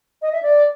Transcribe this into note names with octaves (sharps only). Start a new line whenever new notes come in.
D#5
E5
D5